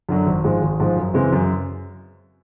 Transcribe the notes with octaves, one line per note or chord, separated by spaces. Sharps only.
F#2 D3 F#3
G#1
G#2 F3 G#3
G#1
G#2 F3 G#3
F#2
C#3 E3 G#3 C4
F#2